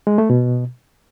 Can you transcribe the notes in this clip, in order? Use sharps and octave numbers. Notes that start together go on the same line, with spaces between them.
G#3
A3
B2